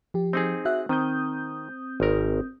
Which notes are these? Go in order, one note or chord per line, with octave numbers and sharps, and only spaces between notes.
F3 G4
C4 D#4 G#4
F#4 E5 F#6
D#3 C4 D#6 G6
G#1 A#4